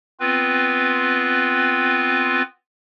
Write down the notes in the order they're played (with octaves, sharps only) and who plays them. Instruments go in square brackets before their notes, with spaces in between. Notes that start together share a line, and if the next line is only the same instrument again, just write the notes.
[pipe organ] B3 C4 F4 B4